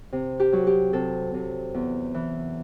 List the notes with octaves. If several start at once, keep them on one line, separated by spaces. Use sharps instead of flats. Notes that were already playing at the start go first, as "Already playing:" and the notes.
C3
G4
F#3
G4
C3 A4
C3
E2
E3